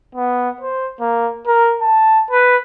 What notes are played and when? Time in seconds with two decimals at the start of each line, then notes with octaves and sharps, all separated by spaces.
0.15 B3
0.61 C5
1.00 A#3
1.47 A#4
1.81 A5
2.31 B4